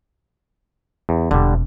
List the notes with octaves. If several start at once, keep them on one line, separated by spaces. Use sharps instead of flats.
E2
E1 D3 G3